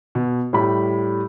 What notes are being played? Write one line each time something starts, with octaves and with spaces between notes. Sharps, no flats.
B2
A2 G3 B5